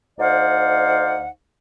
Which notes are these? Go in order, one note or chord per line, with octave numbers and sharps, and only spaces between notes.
D2 D#4 C5 D5 F5 F#5